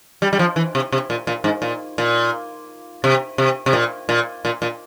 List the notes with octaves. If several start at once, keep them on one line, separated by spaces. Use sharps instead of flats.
G3
G3
F3
E3
C3
C3
A#2
A#2
G#2
A#2
A#2
C3
C3
C3
A#2
A#2
A#2
A#2